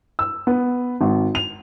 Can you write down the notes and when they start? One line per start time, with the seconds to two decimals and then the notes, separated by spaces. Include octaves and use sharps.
0.19 E6
0.47 B3
1.01 G#1
1.35 F7